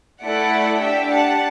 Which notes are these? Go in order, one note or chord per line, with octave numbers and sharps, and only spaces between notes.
A3 E4 A4 D5 F#5
D4 G4 E5 G5
F#5 A5